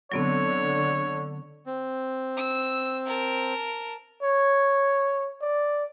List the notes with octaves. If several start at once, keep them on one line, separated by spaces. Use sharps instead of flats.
D3 F#3 B3 C4 C#5
C4
E6
A#4 A5
C#5
D5